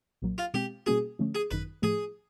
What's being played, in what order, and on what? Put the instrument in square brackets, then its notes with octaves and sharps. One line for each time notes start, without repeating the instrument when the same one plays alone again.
[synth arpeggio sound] B1 A#2 F#3 A#3
[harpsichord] F4
[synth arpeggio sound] B2 G#3 C4 [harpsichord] G4
[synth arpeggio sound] B2 G3 A#3 C#4 F#4 [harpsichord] G#4
[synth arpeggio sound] D3 F3 A3 C#4
[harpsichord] G#4
[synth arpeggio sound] G#1 F#2 D#3 [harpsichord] B4
[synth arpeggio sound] A2 F3 A3 [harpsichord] G#4